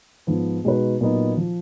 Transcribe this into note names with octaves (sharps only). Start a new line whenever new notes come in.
G#2 F3 B3
B2 G#3 D#4 F#4 B4
A#2 F#3 B3 D#4 F#4
F3